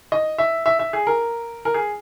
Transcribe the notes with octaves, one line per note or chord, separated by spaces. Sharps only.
D#5
E5
E5
E5
G#4
A#4
A#4
G#4